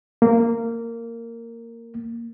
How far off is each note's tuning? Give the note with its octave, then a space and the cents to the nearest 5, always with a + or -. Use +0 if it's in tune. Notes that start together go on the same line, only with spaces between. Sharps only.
A#3 -15